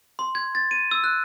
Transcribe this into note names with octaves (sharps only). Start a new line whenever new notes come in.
C6
G#6
A6
D#7
E6
F#6